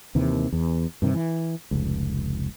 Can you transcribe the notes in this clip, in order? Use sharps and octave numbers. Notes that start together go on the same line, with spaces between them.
D#2 C3 D#3 E3
E2
G2 C3 D#3
E3
F1 C#2